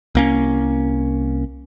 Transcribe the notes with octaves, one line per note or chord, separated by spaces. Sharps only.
C2 A#3 C#4